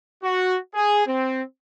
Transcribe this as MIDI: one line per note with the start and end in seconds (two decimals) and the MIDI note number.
0.23 0.57 66
0.75 1.04 68
1.07 1.42 60